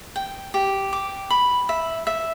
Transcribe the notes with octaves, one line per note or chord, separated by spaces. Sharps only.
G5
G4
D6
B5
E5
E5